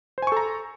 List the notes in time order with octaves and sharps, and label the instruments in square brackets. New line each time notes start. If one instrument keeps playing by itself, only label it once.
[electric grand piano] C5
G#5
C#6
A4
A#5